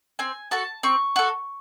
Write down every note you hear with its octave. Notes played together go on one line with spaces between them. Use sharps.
C4 G#5
F#4 A4 A5
C4 C#6
F#4 A4